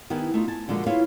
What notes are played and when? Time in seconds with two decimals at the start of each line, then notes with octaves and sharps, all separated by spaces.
0.10 D#3 B3 E4 G4 B4 G#5
0.34 A3 D#4 F4
0.48 G#5 A5
0.68 A#2 D3 F3 G#3 A#3 F#4
0.86 E4 F4 G#4 B4 C#5 F5